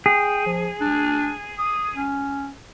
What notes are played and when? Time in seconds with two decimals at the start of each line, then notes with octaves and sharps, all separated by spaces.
0.06 G#4 G5
0.46 F3
0.81 D4
1.59 D#6
1.96 C#4